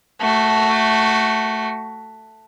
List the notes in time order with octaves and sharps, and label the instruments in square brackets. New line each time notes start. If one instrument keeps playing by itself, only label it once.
[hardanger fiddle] A3 F#4